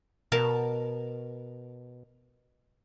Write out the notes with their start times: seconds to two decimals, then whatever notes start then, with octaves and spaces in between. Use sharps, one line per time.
0.32 B2 A#4 A5